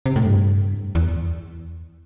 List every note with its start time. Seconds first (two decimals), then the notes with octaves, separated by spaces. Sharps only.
0.06 C3
0.16 A2
0.25 G2
0.95 E2